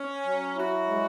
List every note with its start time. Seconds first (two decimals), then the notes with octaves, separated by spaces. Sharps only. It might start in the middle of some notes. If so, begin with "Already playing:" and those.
Already playing: C#4
0.25 F#3
0.56 E4 F#4
0.87 G#3